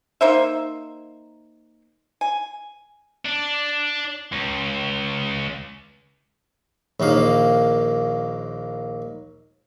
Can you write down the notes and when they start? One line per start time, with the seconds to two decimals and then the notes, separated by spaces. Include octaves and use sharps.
0.21 A#3 D#4 C5 E5
2.21 G#5
3.25 D4
4.32 C#2
7.00 A#1 D#2 A#3 F5